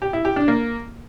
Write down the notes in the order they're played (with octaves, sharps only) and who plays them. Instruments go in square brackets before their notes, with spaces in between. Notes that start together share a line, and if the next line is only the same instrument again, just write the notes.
[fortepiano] G4
E4
G4
D4
A#3